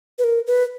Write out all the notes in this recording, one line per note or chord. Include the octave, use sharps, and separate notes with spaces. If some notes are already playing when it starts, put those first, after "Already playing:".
B4
A#4
B4